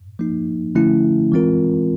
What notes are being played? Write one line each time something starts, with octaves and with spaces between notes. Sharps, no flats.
F3 A#3 D#4
D3 F3 A3 C#4 E4
E3 G#3 C4 F4 A#4